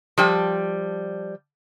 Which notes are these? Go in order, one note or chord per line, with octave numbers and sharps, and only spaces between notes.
F3 G3 G5